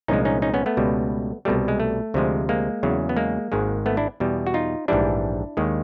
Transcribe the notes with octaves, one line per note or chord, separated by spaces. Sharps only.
C2 A#2 F3 G#3 C#4 D#4
C#4 D#4
C#4 D#4
B3 C#4
A3 B3
C#2 B2 G3
C2 B2 G3 A3
G#3
A3
D2 C3 F3 G#3
G#3 A#3
E2 C#3 F#3
B3
G#3 A#3
G#1 G#2 D#3 G#3
A3 B3
D4 E4
E2 B2 G3
F#4
D#4 F4
A#1 G#2 E3 G3 D4 E4
D#2 D#3 G#3